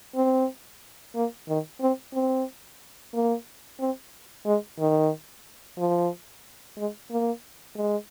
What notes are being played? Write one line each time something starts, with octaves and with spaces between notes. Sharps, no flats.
C4
A#3
D#3
C4
C4
A#3
C4
G#3
D#3
F3
G#3
A#3
G#3